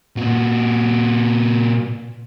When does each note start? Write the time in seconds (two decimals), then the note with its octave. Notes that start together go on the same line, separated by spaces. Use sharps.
0.17 A#2 F#4